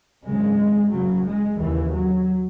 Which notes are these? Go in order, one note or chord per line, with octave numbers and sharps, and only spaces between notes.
G#1 F#2 C#3 G#3
F#1 F#2 C#3 F#3
G#3
D#2 C#3 E3
F#3